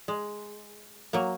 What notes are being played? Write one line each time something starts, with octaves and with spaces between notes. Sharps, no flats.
G#3
F#3 A#3